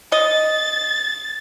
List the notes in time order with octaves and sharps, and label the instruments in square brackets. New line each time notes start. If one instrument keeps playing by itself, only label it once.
[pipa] D#5 [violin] A6